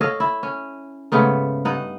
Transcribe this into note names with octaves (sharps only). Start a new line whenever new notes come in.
A4 C#5 D#5 F5
E4
C#4
G#2 C#3 A3 B3
G2 D#4 F#5